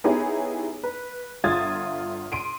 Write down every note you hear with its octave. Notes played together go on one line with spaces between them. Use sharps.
B3 D#4 E4 G4 G#4 C#5
B4
G1 F4 E5 D#6 G#6 A6
C6 D7 D#7